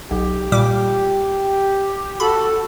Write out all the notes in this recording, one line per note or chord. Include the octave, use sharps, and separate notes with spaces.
B1 G4
A#2 G3 D6
F#4 A4 B5